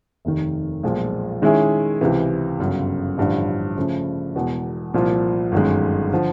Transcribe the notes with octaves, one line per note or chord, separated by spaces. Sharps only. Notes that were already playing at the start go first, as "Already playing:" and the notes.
F1 D#2 D#3
B1 A#2 F3 G#3
D#3 G#3 C#4 E4 G#4
C#2 C3 E3
G1 F#2 C#3
A1 G2 D3 F3
C#3 F3 A3 C#4
E1 E2 B2
C2 A#2 F3
G1 F#2 D#3 G#3
D3 F3